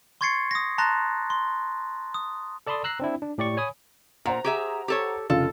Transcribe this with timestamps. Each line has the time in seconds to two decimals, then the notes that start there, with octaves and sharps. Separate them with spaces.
0.21 C6 C#6 G#6 A6 C7 C#7
0.51 D#6 A#6
0.78 A5 A#5 C6 F#6 A6 A#6
1.30 C6
2.14 D#6
2.67 A4 D5 A5 B5 C6 D#6
2.84 A#5 E6 F#6 A#6 C7
3.00 C4 D4 E4
3.22 D4
3.38 A2 G4 D5 C#6
3.57 C#5 G#5 B5 D#6
4.26 A#2 C5 F#5 A#5
4.44 G4 G#4 E5
4.88 G4 A4 C#5
5.30 F1 C#3 F4 A4